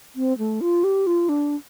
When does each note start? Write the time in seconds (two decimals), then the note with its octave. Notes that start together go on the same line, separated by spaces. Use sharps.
0.16 C4
0.38 A3
0.61 F4
0.84 G4
1.07 F4
1.29 D4